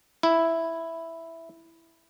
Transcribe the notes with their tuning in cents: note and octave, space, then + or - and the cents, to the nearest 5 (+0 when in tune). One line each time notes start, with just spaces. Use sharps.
E4 +0